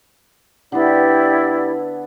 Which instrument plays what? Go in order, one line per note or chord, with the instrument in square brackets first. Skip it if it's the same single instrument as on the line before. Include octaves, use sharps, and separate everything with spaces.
[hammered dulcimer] D3 B3 [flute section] E4 G4 D5